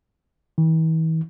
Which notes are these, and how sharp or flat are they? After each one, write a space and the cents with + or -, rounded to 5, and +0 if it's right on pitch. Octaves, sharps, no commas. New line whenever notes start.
E3 -45